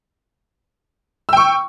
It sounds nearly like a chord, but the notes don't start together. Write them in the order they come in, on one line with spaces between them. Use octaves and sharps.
E6 G5 C#6